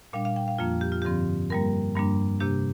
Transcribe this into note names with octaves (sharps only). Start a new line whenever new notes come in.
A#2 G3 D4 F5
F5
G5
F5
F2 F3 A#3 D4 F4
G4
F4
G2 D3 F3 C4 G4
G2 G3 A#3 A#4
G2 G3 A#3 D4
C3 A#3 D4 G4